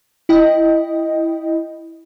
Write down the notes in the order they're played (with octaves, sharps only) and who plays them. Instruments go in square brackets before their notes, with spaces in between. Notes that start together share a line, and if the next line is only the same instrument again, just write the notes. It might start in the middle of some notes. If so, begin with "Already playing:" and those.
[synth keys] E4 D#5 G5